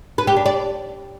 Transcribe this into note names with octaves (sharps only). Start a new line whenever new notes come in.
B4
G4
D4
D5